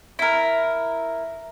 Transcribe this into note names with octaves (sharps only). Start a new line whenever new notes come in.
E4 A#4